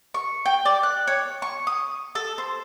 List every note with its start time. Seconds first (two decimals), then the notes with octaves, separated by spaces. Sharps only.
0.14 C#6
0.46 G5
0.65 D5
0.83 F#6
1.07 C#5
1.42 C#6
1.67 D#6
2.15 A4
2.38 C5